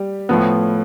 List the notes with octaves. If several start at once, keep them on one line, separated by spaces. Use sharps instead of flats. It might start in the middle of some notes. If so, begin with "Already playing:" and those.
Already playing: G3 G4
A2 F3 B3